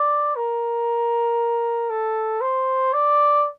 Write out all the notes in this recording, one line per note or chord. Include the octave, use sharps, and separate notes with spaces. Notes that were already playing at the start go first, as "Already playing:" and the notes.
Already playing: D5
A#4
A4
C5
D5